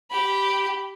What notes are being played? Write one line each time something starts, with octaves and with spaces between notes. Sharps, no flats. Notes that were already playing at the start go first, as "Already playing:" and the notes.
G4 B5